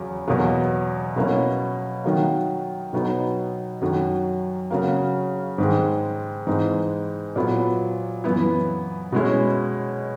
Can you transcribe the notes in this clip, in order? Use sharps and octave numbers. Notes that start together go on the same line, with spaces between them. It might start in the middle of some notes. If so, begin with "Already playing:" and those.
Already playing: E2 C#3 F#3
E2 B2 F#3 A#3
B2 F#3 A#3 C#4 E4
D#3 F#3 A#3
B2 F#3 B3 D#4
F#2 D#3 F#3
C#3 F#3 A#3
G#2 D#3 G#3
G#2 E3 G#3 D#4
A#2 F#3 B3 E4
F#2 E3 B3 E4
B2 G#3 C#4 E4